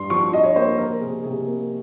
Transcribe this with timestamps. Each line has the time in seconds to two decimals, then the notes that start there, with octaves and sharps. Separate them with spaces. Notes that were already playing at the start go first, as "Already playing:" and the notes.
Already playing: G2 C6
0.10 F3 C#6
0.33 F4 D#5
0.44 C#5
0.55 A#3 C5
0.66 A#4
0.78 F3 A#4
1.01 C3 G#4
1.23 C3 G#4
1.47 A#3